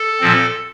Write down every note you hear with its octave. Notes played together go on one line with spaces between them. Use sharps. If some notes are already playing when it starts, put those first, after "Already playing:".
Already playing: A4
A#2 F3 C4